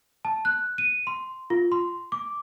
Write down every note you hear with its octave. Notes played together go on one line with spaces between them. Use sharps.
A5
F#6
D#7
C6
F4
C6
D6